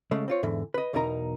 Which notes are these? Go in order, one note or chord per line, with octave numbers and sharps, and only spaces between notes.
C#3 G#3 A3
C4 F4 C#5
E2 G#2 D3 E3
B4 D#5
B1 E2 B2 D#4 A#4 A#5